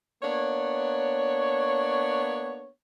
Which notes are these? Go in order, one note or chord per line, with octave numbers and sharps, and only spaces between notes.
A#3 B3 D4 C#5